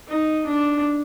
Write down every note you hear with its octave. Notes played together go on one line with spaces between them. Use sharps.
D#4
D4